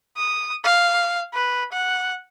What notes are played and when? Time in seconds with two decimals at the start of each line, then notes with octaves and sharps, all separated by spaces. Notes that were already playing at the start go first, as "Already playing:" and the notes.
0.17 D#6
0.64 F5
1.34 B4
1.72 F#5